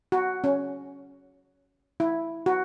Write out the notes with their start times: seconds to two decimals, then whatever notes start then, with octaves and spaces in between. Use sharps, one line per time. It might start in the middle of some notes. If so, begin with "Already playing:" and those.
0.12 F#4
0.44 C#4
2.00 E4
2.46 F#4